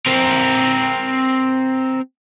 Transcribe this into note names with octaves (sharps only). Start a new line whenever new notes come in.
C4 A#4